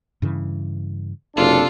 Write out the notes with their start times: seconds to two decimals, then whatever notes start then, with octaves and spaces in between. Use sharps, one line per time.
0.22 G2 C#3 E3
1.37 F#1 C3 D4 F4 A4